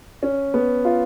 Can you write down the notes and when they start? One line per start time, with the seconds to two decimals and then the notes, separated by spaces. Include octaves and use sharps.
0.23 C#4
0.54 B3
0.85 F4